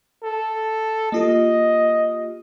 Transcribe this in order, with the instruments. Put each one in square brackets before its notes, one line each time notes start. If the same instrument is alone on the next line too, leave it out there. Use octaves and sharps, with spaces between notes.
[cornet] A4
[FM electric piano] A#3 F4 G4 [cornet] D#5